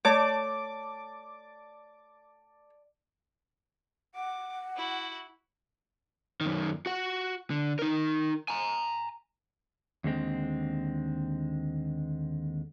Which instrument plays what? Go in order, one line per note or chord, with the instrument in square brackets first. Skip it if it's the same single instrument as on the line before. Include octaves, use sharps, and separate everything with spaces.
[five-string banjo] A3 C#5 [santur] D5 A5 [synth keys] D6
[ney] F#5 [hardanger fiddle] D6
[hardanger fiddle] E4 F#4
[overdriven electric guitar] F#2 D#3
F#4 F#5
D3
D#4 A#4
G#5 A#5
[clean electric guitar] D#2 D3 G#3 C4